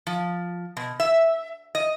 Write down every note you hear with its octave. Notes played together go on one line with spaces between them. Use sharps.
F3
B2
E5
D#5